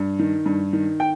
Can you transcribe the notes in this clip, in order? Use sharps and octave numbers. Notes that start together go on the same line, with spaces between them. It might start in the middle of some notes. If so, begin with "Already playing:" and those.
Already playing: G2
D#3
G2
D#3
G5